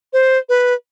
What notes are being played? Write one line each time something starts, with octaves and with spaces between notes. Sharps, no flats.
C5
B4